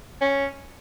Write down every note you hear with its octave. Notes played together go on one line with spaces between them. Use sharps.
C#4